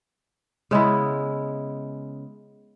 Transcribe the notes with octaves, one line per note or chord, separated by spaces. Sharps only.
C#3 G#3 B3 E4